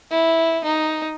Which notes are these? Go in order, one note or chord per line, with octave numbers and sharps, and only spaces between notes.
E4
D#4